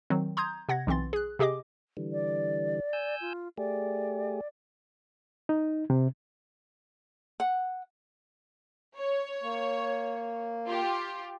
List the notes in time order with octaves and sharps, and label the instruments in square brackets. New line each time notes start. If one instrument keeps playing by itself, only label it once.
[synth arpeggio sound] D#3 F#3 C4
A#5 C6 D#6 G6 G#6
C3 F#5 G#6 A#6
B1 E3 C4 C6 A6
G#4 F#6
C3 G4 G#4 D#5 D6
[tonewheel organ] D3 E3 G3
[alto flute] D5
[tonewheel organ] G#5 E6 G6
[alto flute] F4
[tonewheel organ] A3 G4 G#4 [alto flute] D5
[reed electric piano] D#4
C3
[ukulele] F#5
[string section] C#5
[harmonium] A#3
[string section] F4 G4